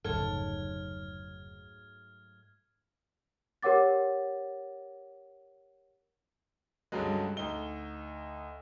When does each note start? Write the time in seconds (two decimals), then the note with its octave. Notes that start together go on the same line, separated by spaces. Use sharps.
0.05 F1 C#2 G#2 F#3 A3 A4 F6 G#6
3.62 G4 A#4 C#5 F#5 D6 A6
6.92 C#2 G2 D3 F#3 G#3
7.37 D2 D#4 G7